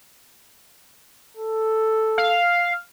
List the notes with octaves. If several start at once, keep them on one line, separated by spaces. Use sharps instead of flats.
A4
F5